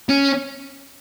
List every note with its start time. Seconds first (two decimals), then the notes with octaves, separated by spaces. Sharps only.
0.09 C#4